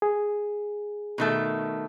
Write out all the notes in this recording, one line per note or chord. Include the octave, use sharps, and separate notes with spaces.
G#4
B2 D#3 A3